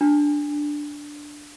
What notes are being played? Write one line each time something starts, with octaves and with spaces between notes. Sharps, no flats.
D4